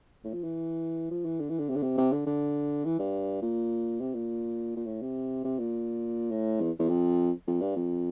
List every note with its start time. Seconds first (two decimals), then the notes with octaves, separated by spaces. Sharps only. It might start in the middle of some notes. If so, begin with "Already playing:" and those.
0.24 A2
0.33 F3
0.44 E3
1.11 F3
1.25 E3
1.40 D3
1.49 E3
1.59 D3
1.69 C3
1.76 D3
1.83 C3
1.98 C3
2.12 D3
2.26 D3
2.85 E3
2.99 G2
3.42 A#2
4.00 C3
4.14 A#2
4.76 A#2
4.86 A2
5.02 C3
5.44 C3
5.59 A#2
6.31 A2
6.61 E2
6.79 E2
6.89 F2
7.47 F2
7.61 G2
7.76 F2